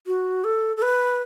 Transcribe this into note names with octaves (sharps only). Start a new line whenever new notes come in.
F#4
A4
A4
B4